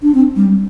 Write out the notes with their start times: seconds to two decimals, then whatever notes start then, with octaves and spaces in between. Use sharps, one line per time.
0.03 D4
0.15 C4
0.36 G3